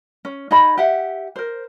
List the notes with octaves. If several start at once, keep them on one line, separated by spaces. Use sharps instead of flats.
C#4
D#4 G#4 D#5 B5
G4 E5 F#5
A#4 C5